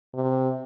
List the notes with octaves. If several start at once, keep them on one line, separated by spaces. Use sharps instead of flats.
C3